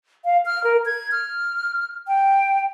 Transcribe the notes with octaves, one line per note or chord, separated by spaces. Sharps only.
F5
F6
A#4
G#6
F6
G5